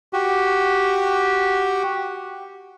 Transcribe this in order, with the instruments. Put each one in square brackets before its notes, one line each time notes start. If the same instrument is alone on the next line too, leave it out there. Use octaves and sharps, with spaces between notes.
[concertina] F#4 G4